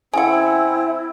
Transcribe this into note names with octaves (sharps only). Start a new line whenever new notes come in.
C#3 C4 E4 F#5 G#5